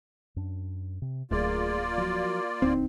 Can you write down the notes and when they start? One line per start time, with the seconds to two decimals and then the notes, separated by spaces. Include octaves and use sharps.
0.36 F#2 D4
1.02 C3
1.31 D1 A3 A#3 F4 G#4 D5
1.98 F3 F#3 F#4
2.62 D#1 D2 C4 D4 D#4